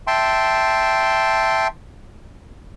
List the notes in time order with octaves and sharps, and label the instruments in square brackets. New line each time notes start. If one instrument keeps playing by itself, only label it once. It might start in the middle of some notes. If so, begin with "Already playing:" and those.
[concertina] E5 G5 A5 C6